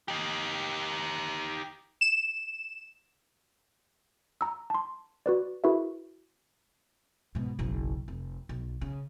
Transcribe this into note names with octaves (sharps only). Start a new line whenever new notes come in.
D#4 G4
E7
A#5 E6
A5 C6
F#4 B4 D5
E4 F#4 G#4 A#4 B4 E5
G#2 B2
F#1 B1
F1
B1
C#3